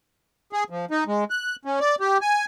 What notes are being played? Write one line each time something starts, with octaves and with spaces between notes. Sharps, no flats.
G#4
F3
D#4
G#3
F#6
C#4
D5
G4
G#5